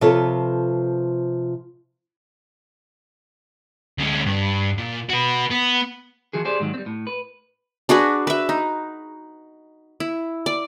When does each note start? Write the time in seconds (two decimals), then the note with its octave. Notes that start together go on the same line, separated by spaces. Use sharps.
0.01 C3 F3 F4 A4 B4 C#5
3.98 D2 C#4
4.26 G2
4.78 A#2
5.09 F#4 B4
5.50 B3
6.33 E3 F3 F#4 G#4
6.45 G4 G#4 C5 D5
6.60 G#2 D#3 F#3
6.74 G3 C4
6.86 A2
7.07 B4
7.89 D4 F#4 G#4 B4
8.27 B4 E5
8.49 D#4
10.00 E4
10.46 D5